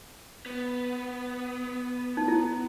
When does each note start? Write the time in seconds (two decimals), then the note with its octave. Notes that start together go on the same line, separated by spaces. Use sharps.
0.46 B3
2.17 D#4
2.28 E4